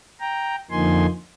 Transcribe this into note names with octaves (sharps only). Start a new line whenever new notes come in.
G5 A#5
F2 D3 F3 A#3 D#4 G#5 C6